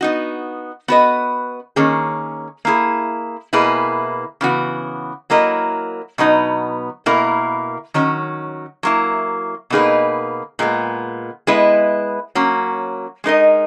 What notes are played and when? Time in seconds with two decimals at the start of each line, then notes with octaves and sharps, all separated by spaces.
0.01 B3 D#4 F#4
0.88 B3 F#4 B4 D#5
1.76 D#3 A#3 C#4 G#4
2.65 A#3 E4 G#4
3.53 B2 A#3 E4 G#4 B4
4.41 C#3 E3 B3 F#4
5.30 F#3 A#3 E4 A#4 D#5
6.18 B2 F#3 B3 D#4
7.06 B2 A#3 E4 A#4
7.94 D#3 F#3 C#4
8.83 F#3 A#3 E4
9.70 B2 A#3 D#4 G#4 B4
10.59 A#2 G#3 B3
11.47 G#3 B3 E4 B4 D#5
12.35 F#3 A#3 C#4
13.24 G#3 D#4 A#4 D#5